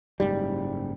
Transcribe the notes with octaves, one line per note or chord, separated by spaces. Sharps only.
F#1 G#2 G3